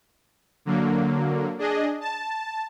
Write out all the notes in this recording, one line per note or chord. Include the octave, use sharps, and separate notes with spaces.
D3 F#3 A#3
D4 G#4 D#5
A5